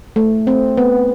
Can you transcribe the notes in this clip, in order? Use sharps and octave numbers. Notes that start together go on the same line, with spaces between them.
A3
C4
B3